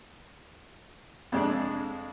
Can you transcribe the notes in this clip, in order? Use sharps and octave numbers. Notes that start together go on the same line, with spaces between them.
F2 C3 G#3 D4